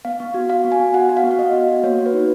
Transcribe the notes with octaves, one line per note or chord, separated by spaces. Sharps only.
B3 F5
B3
F#4
F#4 F5
B3
G#5
B3
F#4 F#5
F#4
F5
B3
F5
B3 D#5
F#4
F#4
A#3 C#5
F#4
B4
D#4